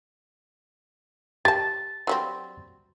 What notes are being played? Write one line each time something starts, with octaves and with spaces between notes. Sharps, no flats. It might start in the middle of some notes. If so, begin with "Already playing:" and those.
G4 A5 A6
F#3 G3 C4